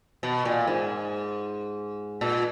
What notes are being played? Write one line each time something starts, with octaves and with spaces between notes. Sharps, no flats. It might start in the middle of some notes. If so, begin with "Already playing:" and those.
B2
A#2
G#2
A#2